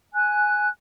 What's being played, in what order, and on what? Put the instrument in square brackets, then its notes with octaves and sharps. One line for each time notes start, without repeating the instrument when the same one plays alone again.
[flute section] G#5 F#6